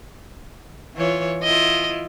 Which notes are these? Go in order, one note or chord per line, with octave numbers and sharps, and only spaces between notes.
E3 F4 C#5
E4 F4 D#5